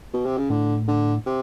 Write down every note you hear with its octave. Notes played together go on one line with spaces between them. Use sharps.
B2
C3
C#3
A2 D3
D3
C3